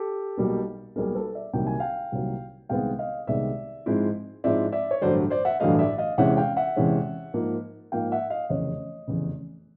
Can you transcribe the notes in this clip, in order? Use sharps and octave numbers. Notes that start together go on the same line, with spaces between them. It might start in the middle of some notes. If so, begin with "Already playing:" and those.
Already playing: G4 A4
B1 B2 G3 A#3
B1 B2 G3 A#3 G#4 A#4
A4 B4
D5 E5
C2 C3 D#3 F#3 A#3 G5
G#5
F5 G5
C2 C3 D#3 F#3 A#3
C2 C3 D#3 G#3 B3 F5 G5
D#5 F5
C2 C3 D#3 G#3 B3 D5 E5
G#2 F3 G#3 C4 E4
G#2 F3 G#3 C4 E4 D5 E5
D5 E5
C#5
A1 G2 D3 F#3 A3 C5 D5
C5 D5
E5 F#5
A1 G2 D3 F#3 A3 D#5 F5
D5 E5
D#5 F5
E2 C3 E3 G#3 C#4 E5 F#5
F5 G5
E5 F#5
E2 C3 E3 G#3 C#4
G#2 F3 A#3
G#2 F3 A#3 F5 G5
E5 F#5
D#5 F5
F1 E2 C#3 C#5 D#5
F1 E2 C#3